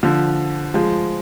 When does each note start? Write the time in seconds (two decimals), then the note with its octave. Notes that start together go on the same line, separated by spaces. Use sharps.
0.03 D3 F3
0.74 F3 G#3